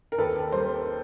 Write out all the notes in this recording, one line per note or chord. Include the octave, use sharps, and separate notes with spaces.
A#4
D#2 A4 B4
G3 A#4 C5